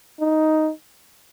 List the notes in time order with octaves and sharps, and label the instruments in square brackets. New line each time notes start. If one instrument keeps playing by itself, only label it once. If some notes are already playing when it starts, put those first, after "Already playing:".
[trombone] D#4